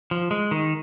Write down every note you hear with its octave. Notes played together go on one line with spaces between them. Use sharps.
F3
G#3
D#3